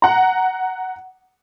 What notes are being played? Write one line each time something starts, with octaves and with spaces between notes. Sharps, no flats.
F#5 A#5